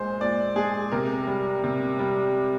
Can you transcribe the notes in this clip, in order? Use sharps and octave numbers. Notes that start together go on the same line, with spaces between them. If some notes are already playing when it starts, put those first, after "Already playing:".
Already playing: A#2 G#3 C5
A#2 D5
G#3 G#4
C3 A#4
G3
C3
G3